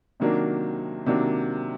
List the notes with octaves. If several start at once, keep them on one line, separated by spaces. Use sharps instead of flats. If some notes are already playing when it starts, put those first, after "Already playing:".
C3 D#3 F#3 A#3 D4
C3 D#3 F#3 A#3 D4